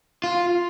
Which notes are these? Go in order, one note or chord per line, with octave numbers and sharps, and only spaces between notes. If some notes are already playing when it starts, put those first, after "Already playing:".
F4